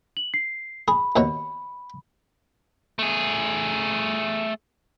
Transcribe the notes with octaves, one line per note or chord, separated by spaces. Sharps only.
F#7
C7
G#4 B5
D#2 B2 C#5
A3 G#4